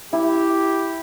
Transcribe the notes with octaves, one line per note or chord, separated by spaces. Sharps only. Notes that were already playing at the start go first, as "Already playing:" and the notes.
E4 G4